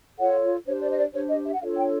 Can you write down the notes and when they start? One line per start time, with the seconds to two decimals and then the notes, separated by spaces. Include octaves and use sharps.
0.18 F4 A4 C#5 F#5
0.66 D4 G4 C5 C#5
0.81 D5
0.92 D#5
0.98 D5
1.13 D4 G4 C5 C#5
1.29 D#5
1.45 E5
1.53 F#5
1.60 D4 F4 A4 C#5 F5
1.76 G5